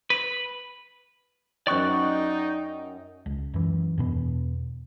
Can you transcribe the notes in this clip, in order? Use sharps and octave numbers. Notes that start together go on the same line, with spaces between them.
B4
F#2 D#4 D5 D#5 G5 C#6 F#6
C#2
F#2 E3
E2 B2 B3